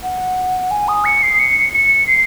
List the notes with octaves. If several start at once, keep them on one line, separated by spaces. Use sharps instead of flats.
F#5
G#5
D#6
C#7
C7
C#7
C#7
C7